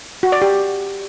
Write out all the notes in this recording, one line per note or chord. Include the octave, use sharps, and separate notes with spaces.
F#4
D5
G4